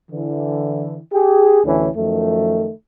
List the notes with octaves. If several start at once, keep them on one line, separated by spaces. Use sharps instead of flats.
D3 E3
G4 G#4
D2 A2 D3 E3 C#4
F#2 D#3 F3 A3